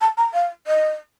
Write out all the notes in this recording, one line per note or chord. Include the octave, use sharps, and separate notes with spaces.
A5
A#5
F5
D#5